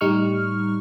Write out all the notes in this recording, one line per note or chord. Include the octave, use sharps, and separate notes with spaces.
A2 G3 D#4 C#6 F6